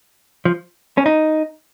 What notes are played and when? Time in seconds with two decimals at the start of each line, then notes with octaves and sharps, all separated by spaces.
0.45 F3
0.98 C#4
1.06 D#4